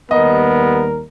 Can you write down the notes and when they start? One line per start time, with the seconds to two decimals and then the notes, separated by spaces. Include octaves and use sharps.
0.11 D#2 G3 B3 A#4 D#5